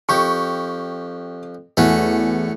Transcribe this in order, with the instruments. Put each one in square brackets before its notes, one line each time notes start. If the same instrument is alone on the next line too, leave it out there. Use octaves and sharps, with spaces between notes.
[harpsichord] F2 G4 [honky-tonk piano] C#6
[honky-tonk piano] E2 [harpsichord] A3 C#4 F#4